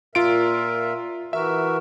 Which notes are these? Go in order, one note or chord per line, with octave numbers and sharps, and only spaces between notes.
A#2 F4 A#4 E5 D7
E3 F#4 A#4 E5